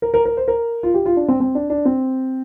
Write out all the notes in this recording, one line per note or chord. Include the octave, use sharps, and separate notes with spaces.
A#4
A#4
A#4
C5
A#4
F4
G4
F4
D4
C4
C4
D4
D4
C4